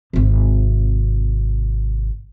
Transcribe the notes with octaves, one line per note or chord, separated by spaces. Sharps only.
G#1 C3